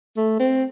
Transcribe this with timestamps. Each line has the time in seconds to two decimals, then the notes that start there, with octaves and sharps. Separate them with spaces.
0.17 A3
0.40 C4